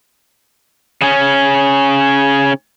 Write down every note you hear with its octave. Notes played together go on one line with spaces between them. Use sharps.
C#3 C#4